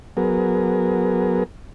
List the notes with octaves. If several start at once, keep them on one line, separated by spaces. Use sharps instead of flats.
F#3 B3 G#4 A#4